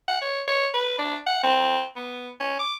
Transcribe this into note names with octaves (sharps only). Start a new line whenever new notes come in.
F#5
C#5
C#5
B4
D4
F#5
C4
B3
C#4
D6